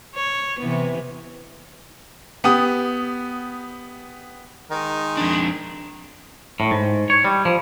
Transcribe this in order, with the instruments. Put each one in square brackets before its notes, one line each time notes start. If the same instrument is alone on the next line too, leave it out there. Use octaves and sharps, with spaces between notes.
[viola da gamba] C#5
C3 E3 B3
[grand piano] B3 G4 D#6
[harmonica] D#3 G#3 A#4
[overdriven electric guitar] F2 D4
[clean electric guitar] A2
G#2
C#5
G3
F3